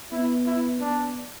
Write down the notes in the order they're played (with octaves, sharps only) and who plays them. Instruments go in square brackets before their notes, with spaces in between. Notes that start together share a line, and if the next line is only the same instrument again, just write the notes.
[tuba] B3 [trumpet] E4
[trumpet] E4
[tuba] B3 [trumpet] D4